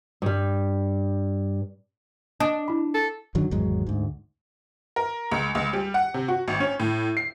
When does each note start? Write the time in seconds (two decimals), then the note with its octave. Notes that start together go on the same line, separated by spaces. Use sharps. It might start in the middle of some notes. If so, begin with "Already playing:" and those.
0.22 G2 G3
2.40 D4 D#5 D#6
2.68 E4 B5
2.94 A4
3.35 F#2 D3 D#3 F#3
3.51 G#1 E2 F#3 G#3
3.87 D2 G#2
4.96 A#4
5.31 C#2
5.55 C#2
5.73 G3
5.94 F#5
6.14 C3
6.28 F#4
6.48 G#1
6.60 C#4
6.80 A2
7.17 C7